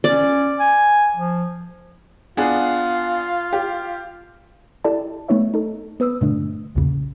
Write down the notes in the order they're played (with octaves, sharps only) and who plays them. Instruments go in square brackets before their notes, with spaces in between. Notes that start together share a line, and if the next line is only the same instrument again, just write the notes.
[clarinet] C#4 [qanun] D5
[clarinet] G#5
F3
[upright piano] B3 D4 G#4 [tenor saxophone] F4
[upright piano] G4
[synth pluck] E4 G4 A4 D5 A5
A3 B3 D#4 C#5 E5
D#4 A4
B3 B4 D#6 E6
G2 A#2 D3 A3 D4
B1 E2 A#2 C#3